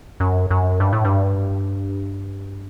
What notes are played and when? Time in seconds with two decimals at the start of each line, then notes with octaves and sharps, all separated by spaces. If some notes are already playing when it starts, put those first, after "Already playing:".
0.20 F#2
0.50 F#2
0.80 G2
0.93 A2
1.05 G2